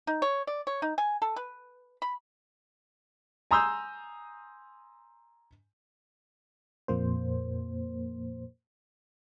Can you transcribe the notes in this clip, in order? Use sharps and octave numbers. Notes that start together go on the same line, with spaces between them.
D#4
C#5
D5
C#5
D#4
G#5
A4
B4
B5
G#5 A#5 C6 D#6 E6 G6
F2 A#2 A#3 C5